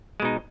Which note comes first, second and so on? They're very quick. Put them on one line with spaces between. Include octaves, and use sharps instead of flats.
G#3 B2 D#4